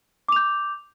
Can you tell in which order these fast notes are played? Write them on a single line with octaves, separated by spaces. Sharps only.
D6 F7 G6